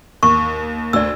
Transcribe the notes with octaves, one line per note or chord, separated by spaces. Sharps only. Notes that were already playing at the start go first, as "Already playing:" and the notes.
D#2 C#6
D2 D5 E6